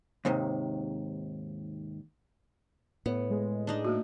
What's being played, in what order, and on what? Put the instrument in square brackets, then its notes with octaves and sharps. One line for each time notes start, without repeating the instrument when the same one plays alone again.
[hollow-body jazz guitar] D#2 G#2 C3 D#3
[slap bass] A2 [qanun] B3
[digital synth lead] G#3
[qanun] D4 D#4 D#5
[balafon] A3 A#3 F#4